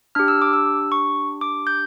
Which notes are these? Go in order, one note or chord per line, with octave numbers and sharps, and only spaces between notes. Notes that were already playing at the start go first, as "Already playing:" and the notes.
D4 G4 F6
E6
D6
E6
C#6
D6
G6